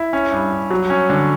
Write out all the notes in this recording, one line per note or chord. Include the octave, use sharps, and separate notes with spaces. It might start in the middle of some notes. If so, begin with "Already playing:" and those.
Already playing: E4
C#4
G2
G2
F#3
C#4
D3